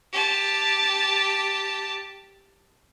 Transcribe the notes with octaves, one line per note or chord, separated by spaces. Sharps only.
G4 A5